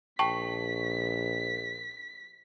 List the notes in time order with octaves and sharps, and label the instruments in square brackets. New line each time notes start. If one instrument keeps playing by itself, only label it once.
[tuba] A#1 [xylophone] G5 A5 C#6 [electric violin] B6